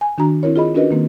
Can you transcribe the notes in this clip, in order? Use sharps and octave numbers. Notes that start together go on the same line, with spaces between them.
G#5
D#3 D4 F#4 A#5
C4 E4 A#4 C#5
F4 G#4 D#5 B5
C#4 D4 F#4 A#4 B4 D#5
D#3 A#3 C4